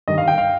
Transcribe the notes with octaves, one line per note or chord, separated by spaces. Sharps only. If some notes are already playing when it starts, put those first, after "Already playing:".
G2 D#3 G3 D#5
F5
G5
F5